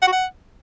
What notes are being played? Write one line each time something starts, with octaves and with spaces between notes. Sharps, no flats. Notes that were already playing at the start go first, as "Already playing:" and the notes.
F#5
F#4
F#5